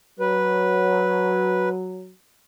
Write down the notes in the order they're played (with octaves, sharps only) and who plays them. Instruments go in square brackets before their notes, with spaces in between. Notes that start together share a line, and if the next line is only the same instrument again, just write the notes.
[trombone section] F#3 [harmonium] B4